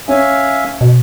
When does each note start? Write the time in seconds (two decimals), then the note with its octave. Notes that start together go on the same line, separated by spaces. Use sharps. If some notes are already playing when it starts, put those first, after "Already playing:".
0.09 C#4 E5 F5 G#5
0.81 B2